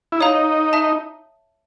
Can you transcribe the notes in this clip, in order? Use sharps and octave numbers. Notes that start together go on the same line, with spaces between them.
E4
D#4 C#5 F5 A#5
E5 A5